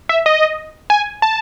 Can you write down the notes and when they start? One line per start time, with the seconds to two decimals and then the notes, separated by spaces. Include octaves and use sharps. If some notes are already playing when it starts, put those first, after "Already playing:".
0.09 E5
0.26 D#5
0.90 G#5
1.22 A5